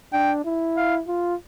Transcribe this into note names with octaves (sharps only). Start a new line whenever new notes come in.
D4 G5
E4
F5
F4